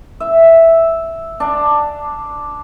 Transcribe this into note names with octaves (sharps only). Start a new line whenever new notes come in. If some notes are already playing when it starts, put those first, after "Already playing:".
E5
D4